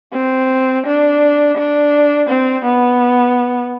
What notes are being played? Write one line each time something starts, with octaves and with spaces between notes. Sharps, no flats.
C4
D4
D4
C4
B3